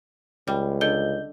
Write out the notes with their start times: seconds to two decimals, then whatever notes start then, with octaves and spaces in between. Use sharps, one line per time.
0.47 C#2 G3
0.81 D3 D#5 G6 G7